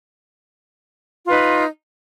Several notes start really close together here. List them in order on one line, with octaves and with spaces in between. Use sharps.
F4 B4 D#4